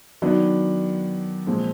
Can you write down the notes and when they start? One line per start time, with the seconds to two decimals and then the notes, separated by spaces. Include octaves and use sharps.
0.22 D#3 F#3 B3 D4
1.47 A#2 F3 G#3 C4